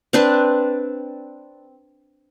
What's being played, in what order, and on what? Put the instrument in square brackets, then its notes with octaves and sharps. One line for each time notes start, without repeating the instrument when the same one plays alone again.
[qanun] C4 D4 B4